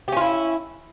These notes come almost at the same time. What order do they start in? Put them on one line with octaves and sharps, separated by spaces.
G4 C#4 F4 E4